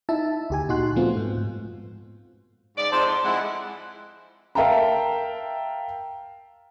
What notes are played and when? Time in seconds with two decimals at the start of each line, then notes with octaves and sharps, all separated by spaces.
0.09 D#4 E4 E5 A5
0.50 D2 G4 G#5
0.69 A#2 D#4 F#4 C6 F#6
0.96 F3 A3 B3 C4 F4
1.17 G#2
1.37 G#2
2.77 G#2 C#3 D5
2.92 F2 G#2 C5 D5 A5
3.07 C6
3.24 F2 G#3 D#4 E4 F#5
4.55 A#4 E5 F5 G5 A5 A#5